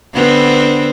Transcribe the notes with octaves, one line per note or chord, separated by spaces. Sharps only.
D3 B3 C4